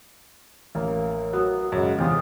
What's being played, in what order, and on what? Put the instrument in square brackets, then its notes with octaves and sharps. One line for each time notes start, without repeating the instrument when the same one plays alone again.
[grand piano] A1 [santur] A#3
[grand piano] F#3 [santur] B3
[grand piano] F#2 C#3 G#3
[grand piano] E2 C3 E3 [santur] F4 G4 D#6